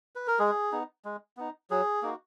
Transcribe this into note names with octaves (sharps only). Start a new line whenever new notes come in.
B4
A#4
G#3 G#4
B3 D#4
G#3
B3 D#4
F#3 G#4
A#3 D#4 F#4